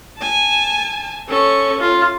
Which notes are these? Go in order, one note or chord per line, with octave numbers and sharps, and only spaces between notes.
G#5 A5
C#4 A4 C#6
F4